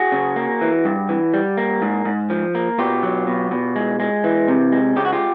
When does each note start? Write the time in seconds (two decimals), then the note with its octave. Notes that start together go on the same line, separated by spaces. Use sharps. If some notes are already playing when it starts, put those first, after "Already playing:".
Already playing: F#4 G#4
0.12 C#3
0.36 A#3
0.61 E3
0.85 G2
1.09 E3
1.34 G3
1.58 A#3
1.82 G#2
2.05 G#2
2.30 F3
2.55 A#3
2.78 B2 F4 G4
3.03 F#3
3.27 B2
3.51 B2
3.76 G#3
4.00 G#3
4.24 E3
4.48 C3
4.72 G#3
4.96 C#3 G4
5.05 F#4
5.12 F4 G4